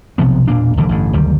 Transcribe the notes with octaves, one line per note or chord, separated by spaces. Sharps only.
B1 C3 F3 B3
E1 A#2 A#3 D4
A#1 D#2 D3 D#3
A1 G2 D3
F#1 D2 D#3 G3